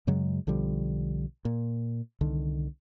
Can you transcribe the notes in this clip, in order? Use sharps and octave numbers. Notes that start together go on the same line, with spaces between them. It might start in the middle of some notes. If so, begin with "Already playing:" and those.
F#2 C#3 F#3 G#3
B1 D3 F3 G3
A#2
C2 D3 D#3